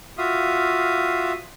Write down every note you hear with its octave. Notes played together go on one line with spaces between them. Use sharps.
F4 F#4 E5 F5 D#6